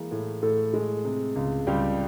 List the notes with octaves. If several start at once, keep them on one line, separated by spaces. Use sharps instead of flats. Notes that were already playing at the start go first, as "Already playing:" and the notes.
Already playing: E3 G#3 A#3
A2
A2 A3 A4
G#3
C3
C#2
C#2 G3 G4